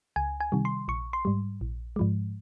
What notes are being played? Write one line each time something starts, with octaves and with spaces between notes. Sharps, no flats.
C#2 G#5
G#5
C3 D#3 G3
C6
A#1 C#6
C6
G#2 G3
A#1
G#2 F3 G#3